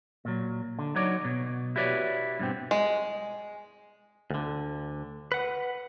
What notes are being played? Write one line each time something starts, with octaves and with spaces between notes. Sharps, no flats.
A#2 F#3
D3
F#3 D#4 C#5 D5
B2
E4 F#4 G4 B4 C#5 D5
G2 B2 C4
G#3
D2 D3
B4 F#5